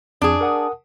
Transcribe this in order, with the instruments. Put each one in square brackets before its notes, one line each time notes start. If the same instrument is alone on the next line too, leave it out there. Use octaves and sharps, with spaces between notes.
[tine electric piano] F2 [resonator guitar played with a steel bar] D4 G#4
[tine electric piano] A#4 F#5 D#6